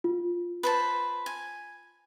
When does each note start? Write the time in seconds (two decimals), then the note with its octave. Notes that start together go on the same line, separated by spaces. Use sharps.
0.04 F4
0.63 B4 C5 A5
1.26 G#5